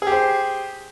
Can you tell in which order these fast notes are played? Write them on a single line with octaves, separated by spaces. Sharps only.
G#4 G4 C5